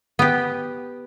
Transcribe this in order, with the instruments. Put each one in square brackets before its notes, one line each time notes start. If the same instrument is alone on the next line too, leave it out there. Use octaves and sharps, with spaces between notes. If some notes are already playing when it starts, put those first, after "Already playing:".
[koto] B3 G4